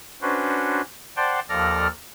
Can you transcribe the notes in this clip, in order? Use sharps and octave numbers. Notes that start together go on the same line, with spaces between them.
C#4 D4 F#4 B4 C5
C5 D5 F#5 G5 A5 C6
D#2 F3 A4 D5 F6 A#6